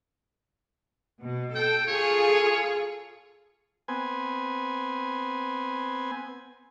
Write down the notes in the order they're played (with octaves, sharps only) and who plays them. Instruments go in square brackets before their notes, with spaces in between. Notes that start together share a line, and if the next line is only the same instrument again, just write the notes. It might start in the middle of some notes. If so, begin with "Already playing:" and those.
[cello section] B2
[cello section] A4 [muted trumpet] G5
[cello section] F4 G#4 A4 [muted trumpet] C#5
[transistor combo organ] B3 C4 G#5